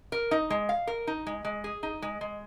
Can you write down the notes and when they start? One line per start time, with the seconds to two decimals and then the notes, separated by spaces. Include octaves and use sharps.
0.12 A#4
0.31 D#4
0.50 G#3
0.69 F5
0.87 A#4
1.07 D#4
1.26 G#3
1.45 G#3
1.64 G#4
1.83 D#4
2.02 G#3
2.21 G#3